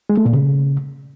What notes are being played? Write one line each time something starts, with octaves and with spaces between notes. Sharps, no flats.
G#3
A3
A#2
C#3